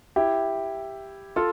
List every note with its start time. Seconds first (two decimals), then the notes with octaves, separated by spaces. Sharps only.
0.16 E4 G4
1.36 F4 A4